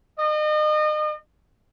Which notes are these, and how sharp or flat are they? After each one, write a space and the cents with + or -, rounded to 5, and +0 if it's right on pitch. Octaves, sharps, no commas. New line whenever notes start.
D#5 -35